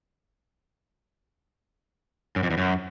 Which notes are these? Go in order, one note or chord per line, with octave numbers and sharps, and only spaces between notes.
F#2
F2
E2
F#2